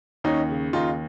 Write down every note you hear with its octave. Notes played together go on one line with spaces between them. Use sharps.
D#2 C#4 D#4
C#3
D#2 D#4 F4